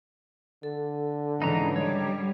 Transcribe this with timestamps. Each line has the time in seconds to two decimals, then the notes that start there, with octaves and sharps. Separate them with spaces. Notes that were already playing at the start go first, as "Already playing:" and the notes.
0.63 D3 A4
1.42 G#2 C#3 E3 D#4 A#5
1.76 G3 C#5 D#5